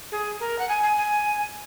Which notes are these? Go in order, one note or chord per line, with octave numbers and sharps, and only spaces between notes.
G#4
A#4
F#5
G#5
G#5
G#5